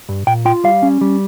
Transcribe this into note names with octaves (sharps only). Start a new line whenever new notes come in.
G2
A#2 G5
F4 G5
G3 F5
C#4
G3